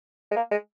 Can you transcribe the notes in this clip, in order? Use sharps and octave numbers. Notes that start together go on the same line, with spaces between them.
G#3
A#3
G#3